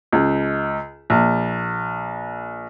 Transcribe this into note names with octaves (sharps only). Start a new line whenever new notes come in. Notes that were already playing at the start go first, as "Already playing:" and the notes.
C#2
A#1